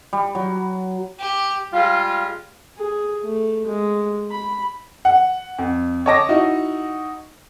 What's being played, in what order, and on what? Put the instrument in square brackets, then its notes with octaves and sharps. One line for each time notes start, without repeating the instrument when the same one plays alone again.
[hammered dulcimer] G3
F#3
[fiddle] G4
[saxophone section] G3 G#3 F4
[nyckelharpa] G#4
A3
G#3
B5
[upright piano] F#5
F2
C#5 D#5 A5 D6 A#6
D#4 E4 F#4 D#5